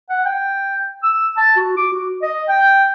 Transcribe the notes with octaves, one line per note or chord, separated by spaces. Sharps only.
F#5
G5
E6
A5
F#4
D6
F#4
D#5
G5